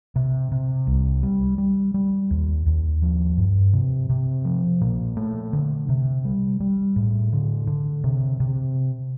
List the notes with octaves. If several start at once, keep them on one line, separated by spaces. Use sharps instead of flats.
C3
C3
C2
G3
G3
G3
D#2
D#2
F3
G2
C3
C3
F3
A#2
A3
D3
C3
G3
G3
A2
D3
D3
C3
C3